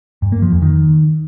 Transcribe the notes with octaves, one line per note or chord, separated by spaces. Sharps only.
G2
A#3
F3
F2
D#3